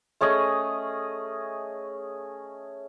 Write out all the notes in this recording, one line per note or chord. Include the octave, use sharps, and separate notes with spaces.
A3 C#4 G#4 D#5